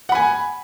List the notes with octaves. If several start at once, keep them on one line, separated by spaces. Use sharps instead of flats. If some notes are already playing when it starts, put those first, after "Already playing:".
F#5 G#5 B5